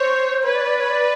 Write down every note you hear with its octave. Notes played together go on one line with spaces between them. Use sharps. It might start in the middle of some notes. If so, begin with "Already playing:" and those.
Already playing: C5 C#5
B4 C#5
D5
C#5
D5
C#5
D5